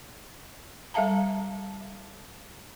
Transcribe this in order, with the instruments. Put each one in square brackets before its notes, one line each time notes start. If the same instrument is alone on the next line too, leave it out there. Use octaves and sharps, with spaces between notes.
[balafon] G3 A4 E5 F5 A5 A#5